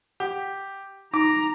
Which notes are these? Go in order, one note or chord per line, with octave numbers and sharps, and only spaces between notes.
G4 F#5
D#4 A#5 D6